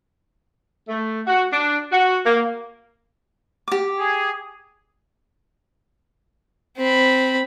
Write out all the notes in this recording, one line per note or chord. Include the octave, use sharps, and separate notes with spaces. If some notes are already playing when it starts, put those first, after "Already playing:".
A3
F#4
D4
F#4
A#3
G4 D6
G#4
C4 B5